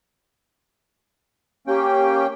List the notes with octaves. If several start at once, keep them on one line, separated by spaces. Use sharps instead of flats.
A#3 C#4 G4 G5